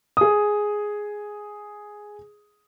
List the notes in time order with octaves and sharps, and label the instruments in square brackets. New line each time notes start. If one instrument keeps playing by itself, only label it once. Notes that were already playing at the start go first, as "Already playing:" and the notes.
[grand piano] G#4 D#6